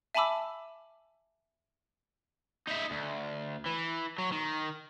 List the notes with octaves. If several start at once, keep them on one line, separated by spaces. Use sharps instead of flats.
E5 G#5 A5 B5 D6 E6
D#4 E5
D2
E3
F#3
D#3